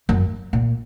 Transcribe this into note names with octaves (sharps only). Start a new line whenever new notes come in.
F#2
A#2